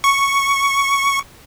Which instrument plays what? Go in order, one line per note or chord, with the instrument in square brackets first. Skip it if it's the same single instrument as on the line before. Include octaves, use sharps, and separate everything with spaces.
[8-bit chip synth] C#6